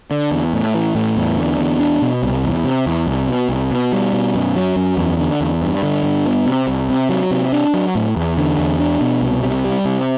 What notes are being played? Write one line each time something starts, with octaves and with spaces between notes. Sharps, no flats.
D3
E2
A2
E3
A2
E2
D3
E2
D4
B2
C2
E2
C3
E2
C2
B2
C2
B2
G3
B2
F#2
F#3
F#2
E2
D3
E2
G2
D3
G2
B3
C3
C2
C3
F#3
C3
D4
F#3
A2
E2
D3
E2
D4
B2
C2
C3
G3
C3